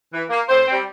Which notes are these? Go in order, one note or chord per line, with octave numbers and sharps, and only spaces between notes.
E3
A#3
A2 C4 C5
G3 C4